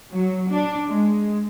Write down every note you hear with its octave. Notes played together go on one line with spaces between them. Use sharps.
F#3
D4
G#3